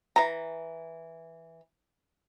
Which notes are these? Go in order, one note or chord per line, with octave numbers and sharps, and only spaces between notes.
E3 A#5